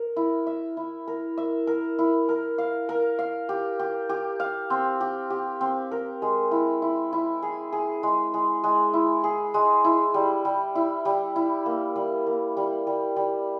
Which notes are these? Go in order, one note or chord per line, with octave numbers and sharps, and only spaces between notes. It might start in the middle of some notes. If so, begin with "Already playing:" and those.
Already playing: A#4
E4
E5
E4
A#4
E5
A#4
E4
A#4
F5
A#4
F5
G4
G4
G4
F5
C4
G4
G4
C4
A#4
G#3
E4
E4
E4
G#4
G#4
G#3
G#3
G#3
E4
G#4
G#3
E4
G3
G3
E4
G3
E4
A#3
G3
A#3
G3
G3
G3